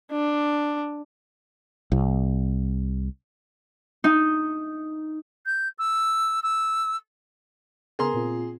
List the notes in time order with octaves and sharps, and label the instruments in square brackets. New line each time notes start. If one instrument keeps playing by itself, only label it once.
[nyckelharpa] D4
[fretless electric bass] C2
[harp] D#4
[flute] G6
E6
E6
[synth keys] C#3 B3 A#4 [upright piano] G#4 A#5 C6
[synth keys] A#2 C4 F4